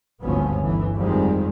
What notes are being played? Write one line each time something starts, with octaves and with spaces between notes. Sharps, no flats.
G#1 D2 G2 F3 B3 C#4
G1 E3
F2 C3 D#3 G3 G#3